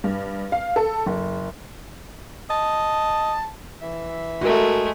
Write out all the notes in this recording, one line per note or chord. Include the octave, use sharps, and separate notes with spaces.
G2
F5
A4
F#1
D#5 A5
E3 E5
G#3 A3 F#4 A#4